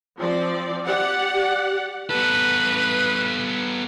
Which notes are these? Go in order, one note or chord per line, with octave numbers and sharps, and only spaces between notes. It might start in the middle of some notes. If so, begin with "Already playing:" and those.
F3 C4 D5
G4 D5 F#5
B3 A4 B4